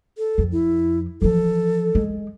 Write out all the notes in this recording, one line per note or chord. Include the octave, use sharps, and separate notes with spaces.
A4
F2
E4
E3 F3 A4
G#3